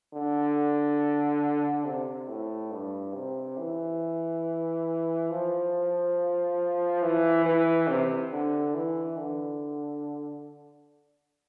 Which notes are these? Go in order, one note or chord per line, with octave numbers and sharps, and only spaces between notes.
D3
C3
A2
G2
C3
E3
F3
E3
E3
C3
D3
E3
D3